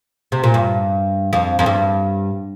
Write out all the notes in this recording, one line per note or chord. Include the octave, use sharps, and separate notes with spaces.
C3
A#2
G2
F2
F2
G2